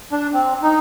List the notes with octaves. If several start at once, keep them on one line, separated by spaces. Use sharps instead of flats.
D4
C4
D#4